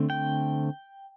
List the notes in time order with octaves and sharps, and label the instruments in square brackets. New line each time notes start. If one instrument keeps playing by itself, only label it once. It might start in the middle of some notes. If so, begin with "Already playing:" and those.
Already playing: [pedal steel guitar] D3 A3 C4
G5